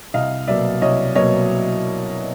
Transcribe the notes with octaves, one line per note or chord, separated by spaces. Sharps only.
C2 D#5 F5
B2 F#3 A#3 D5 E5
C2 C#5 D#5
B2 F#3 A#3 C#5 D#5